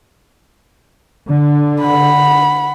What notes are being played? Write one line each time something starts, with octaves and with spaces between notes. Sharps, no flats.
D3
F#5 B5